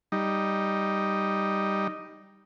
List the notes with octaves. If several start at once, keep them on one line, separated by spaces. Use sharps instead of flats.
G3 D#4